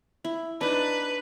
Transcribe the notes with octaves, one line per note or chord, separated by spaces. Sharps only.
E4
D4 D#4 B4